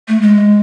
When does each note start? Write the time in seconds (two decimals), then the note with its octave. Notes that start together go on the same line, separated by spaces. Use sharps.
0.08 A3
0.22 G#3